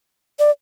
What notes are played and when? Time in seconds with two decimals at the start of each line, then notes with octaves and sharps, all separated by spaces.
0.39 D5